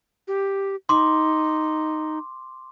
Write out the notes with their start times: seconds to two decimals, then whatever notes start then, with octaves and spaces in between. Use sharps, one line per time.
0.28 G4
0.89 D#4 C6 D6